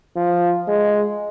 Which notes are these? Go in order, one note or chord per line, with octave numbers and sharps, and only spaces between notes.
F3
G#3